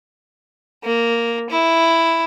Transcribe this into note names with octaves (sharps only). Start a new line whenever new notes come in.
A#3
E4